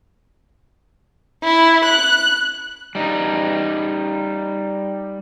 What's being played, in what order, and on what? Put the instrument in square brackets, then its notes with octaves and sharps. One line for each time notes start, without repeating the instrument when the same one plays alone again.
[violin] E4
F#6
[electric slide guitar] G3 D#4